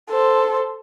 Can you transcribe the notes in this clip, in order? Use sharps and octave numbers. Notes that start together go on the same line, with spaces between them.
A4 C5